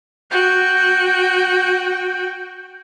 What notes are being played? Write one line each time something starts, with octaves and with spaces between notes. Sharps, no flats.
F#4 G5